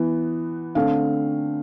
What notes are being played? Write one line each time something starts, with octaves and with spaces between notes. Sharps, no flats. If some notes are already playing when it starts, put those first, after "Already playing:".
Already playing: E3 B3
D3 A3 C4 F5